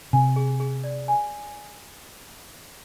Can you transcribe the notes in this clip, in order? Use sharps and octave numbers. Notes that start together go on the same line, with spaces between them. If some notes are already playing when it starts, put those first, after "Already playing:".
C3 G#5
G#4
G#4
D5
G#5